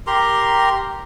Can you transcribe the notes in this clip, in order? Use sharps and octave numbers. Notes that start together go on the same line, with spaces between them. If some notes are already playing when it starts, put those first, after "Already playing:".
G4 A#4 A#5 C6